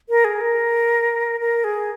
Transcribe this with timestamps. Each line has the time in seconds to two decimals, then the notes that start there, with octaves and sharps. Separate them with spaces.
0.09 A#4
0.24 G#4
0.41 A#4
1.40 A#4
1.64 G#4